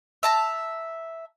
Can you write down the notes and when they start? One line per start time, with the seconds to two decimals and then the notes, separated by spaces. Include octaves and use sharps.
0.23 E5 A5 A#5